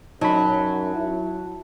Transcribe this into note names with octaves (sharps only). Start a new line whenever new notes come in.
F#2 F#3 D#4 A5 B5
E4